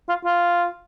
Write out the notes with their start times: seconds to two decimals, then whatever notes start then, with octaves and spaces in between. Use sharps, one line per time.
0.09 F4
0.25 F4